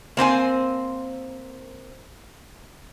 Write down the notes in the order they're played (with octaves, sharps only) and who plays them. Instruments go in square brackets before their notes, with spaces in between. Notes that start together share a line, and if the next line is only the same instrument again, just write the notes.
[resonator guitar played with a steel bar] A#3 C4 C5 G#5